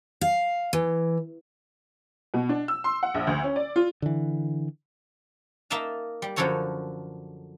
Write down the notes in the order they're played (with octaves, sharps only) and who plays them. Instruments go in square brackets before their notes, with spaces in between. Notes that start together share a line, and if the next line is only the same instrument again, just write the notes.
[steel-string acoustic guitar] F5
E3
[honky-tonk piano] B2
D4
E6
C6
F#5
A#1
D2
C#4
D5
F4
[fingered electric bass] D3 E3
[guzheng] A#3 D#4 E5 A5 A#5
G3
F#2 D3 F3 A4 C#5 A#5